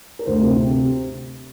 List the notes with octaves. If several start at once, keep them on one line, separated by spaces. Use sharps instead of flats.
A#4
D2 C5
C3
C3